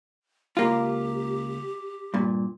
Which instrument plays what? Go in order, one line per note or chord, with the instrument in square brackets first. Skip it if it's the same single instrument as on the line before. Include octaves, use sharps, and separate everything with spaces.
[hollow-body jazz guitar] C#2 A#3 F4 [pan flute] G4
[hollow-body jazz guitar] G2 A#2